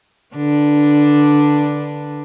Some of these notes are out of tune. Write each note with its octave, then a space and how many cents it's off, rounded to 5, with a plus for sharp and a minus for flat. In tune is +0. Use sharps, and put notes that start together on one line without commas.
D3 +0 D4 +0 B4 -15